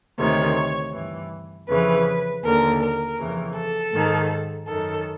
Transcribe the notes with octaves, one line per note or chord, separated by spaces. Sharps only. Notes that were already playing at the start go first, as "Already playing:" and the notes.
D2 C3 D#3 C#5
G2 E3
F2 C#3 E3 B4
D#2 D3 A#4
A#4
F2 C#3 E3
A4
G#2 D#3
F#2 D#3 A4